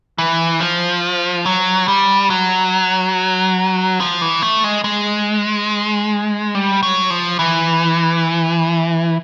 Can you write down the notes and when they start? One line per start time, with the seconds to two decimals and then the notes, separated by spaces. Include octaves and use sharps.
0.18 E3
0.60 F3
1.45 F#3
1.88 G3
2.30 F#3
4.00 F3
4.22 E3
4.42 A3
4.64 G#3
4.84 G#3
6.55 G3
6.83 F#3
7.10 F3
7.39 E3